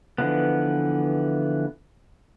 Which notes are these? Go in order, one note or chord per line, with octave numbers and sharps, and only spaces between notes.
D3 E3 F3 B3